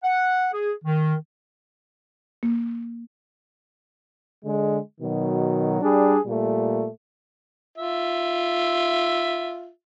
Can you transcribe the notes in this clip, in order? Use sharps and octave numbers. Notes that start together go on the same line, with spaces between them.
F#5
G#4
D#3
A#3
D3 G#3
B2 D#3 F#3
G3 D4 G#4
A#2 G3 A3
F4 E5